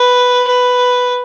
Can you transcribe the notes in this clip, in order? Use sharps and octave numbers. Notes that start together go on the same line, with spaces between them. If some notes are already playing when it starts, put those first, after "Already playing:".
Already playing: B4
B4